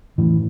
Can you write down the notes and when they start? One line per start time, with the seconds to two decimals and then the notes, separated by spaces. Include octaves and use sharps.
0.18 A2 E3